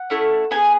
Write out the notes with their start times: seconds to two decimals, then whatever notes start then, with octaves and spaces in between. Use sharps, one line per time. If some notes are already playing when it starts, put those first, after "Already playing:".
Already playing: F#5
0.10 A3 C#4 E4
0.51 B3 D#4 G#5
0.56 G#4